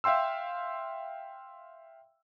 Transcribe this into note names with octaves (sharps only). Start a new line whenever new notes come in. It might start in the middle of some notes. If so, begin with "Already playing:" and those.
E5 F5 G5 C6 E6